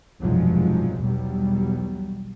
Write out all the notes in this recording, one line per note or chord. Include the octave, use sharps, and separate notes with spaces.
F1 B1 G2 F3 F#3 G#3
B1 E2 B2 F#3 G3